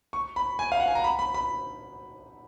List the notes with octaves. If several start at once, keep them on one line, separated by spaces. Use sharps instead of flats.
C#6
B5
G#5
F5
F#5
G#5
A#5
B5
B5
B5